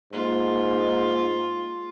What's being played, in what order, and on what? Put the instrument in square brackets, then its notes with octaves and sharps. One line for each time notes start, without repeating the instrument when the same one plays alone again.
[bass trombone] G#2 [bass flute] A#3 [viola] F4